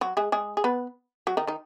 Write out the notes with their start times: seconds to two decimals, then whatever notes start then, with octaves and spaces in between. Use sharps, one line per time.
0.01 F#3 F#4
0.17 G#3 G#4
0.32 G#3 G#4
0.57 G#4
0.64 B3 B4
1.27 F#3 F#4
1.37 D#3 D#4
1.47 D#3 D#4